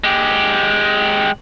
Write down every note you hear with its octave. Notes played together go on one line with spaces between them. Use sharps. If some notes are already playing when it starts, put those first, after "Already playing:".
G#3 G4